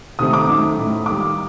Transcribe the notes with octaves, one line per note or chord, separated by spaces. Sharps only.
C3 D#3 A3 C4 D#4 D#6
D6
F#2 D#3 A3 D#4
A2 A3 D#4
D#3 G3 A#3 D6